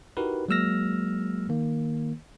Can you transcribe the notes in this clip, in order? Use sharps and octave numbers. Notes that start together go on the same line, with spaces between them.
D#4 E4 F#4 G4 A#4 B4
F#3 G#3 A#3 E6 F6 A#6
D#3 A#3